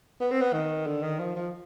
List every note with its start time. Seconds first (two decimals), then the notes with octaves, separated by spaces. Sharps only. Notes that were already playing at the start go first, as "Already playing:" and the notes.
0.20 B3
0.31 C4
0.41 B3
0.53 D#3
0.86 D3
1.03 D#3
1.19 F3
1.36 F3